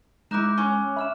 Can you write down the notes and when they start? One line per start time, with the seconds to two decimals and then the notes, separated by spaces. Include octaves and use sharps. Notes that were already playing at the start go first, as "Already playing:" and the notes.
0.31 G#3 D#4 E4 D6 F#6 E7
0.58 C#4 C#6
0.97 E5 B5 F6 E7